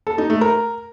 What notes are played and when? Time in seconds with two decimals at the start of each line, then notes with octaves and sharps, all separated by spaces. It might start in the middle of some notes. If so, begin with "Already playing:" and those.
0.07 A4
0.18 D#4
0.30 A3
0.41 A#4